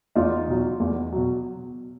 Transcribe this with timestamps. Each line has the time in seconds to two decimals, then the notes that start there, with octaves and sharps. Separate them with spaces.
0.16 E2 D#4 F4
0.48 B2 F#3
0.80 E2
1.12 B2 F#3